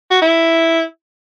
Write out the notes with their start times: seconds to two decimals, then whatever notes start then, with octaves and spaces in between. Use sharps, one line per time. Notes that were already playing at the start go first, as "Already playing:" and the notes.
0.11 F#4
0.22 E4